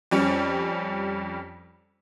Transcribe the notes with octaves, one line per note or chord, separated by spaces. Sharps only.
F2 G3 C#4